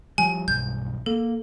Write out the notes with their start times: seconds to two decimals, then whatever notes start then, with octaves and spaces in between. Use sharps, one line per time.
0.18 F3 G3 G#5
0.48 B1 G2 G6
1.06 A#3 A4